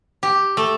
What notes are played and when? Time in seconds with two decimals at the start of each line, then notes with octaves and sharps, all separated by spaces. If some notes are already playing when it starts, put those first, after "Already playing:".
0.23 G4
0.57 A3